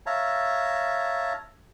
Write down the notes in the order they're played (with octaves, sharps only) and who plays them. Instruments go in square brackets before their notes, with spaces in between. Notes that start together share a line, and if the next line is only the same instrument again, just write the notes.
[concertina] C#5 E5 F5 A5 A#5